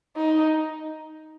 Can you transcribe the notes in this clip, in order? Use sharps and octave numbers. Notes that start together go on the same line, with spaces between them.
D#4